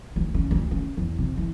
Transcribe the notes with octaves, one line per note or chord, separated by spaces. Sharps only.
D2
C#3
D2
C#3
E2
C3
E3